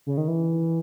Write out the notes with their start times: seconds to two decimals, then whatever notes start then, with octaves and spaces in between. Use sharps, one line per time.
0.07 C#3
0.17 D#3
0.28 E3